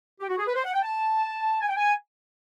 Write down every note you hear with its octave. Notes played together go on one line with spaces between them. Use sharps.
G4
F#4
G#4
B4
C5
F#5
G5
A5
G#5
G5
G#5